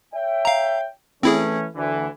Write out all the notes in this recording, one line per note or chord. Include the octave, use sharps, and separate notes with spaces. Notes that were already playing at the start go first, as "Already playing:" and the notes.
C#5 E5 G5
F5 A#5
E3 A3 C4 C#4 E4 G#4
D2 D3 E3